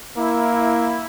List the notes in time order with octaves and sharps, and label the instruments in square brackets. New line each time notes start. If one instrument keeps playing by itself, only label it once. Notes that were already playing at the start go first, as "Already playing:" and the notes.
[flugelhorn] A#3 [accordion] E4